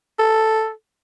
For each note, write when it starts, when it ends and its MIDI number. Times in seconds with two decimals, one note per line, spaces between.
0.19 0.70 69